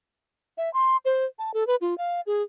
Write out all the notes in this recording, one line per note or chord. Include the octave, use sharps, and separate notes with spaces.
E5
C6
C5
A5
A4
B4
F4
F5
G#4